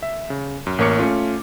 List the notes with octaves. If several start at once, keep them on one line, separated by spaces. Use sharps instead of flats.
E5
C#3
F#2
A1 A#3 A#4 C#5 D6 C#7
A3 C#4 F4